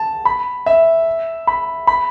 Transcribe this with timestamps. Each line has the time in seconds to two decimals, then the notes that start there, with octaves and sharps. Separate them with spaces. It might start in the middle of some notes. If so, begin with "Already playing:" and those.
Already playing: A5
0.25 B5
0.66 E5
1.47 B5
1.87 B5